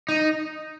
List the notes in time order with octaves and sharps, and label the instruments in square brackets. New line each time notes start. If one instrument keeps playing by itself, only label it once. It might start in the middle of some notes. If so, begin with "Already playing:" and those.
[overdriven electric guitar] D#4